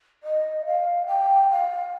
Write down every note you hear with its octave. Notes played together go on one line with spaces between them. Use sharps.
D#5
F5
G5
F5